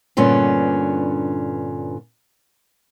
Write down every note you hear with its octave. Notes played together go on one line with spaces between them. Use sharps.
G2 A#2 D3 B3 C#4